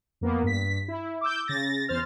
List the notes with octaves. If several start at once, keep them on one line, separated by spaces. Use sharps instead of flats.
F2 A#3 B3
G2 B6
E4
D6 E6 G6
C#3 A6 A#6
E2 C5 F6 A6